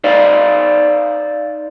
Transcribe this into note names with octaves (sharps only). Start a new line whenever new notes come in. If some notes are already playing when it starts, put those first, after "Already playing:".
D#4 C5 D5 F5